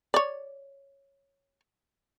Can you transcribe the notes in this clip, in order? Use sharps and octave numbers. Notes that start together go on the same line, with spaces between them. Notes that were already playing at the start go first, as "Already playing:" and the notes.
C#5 D5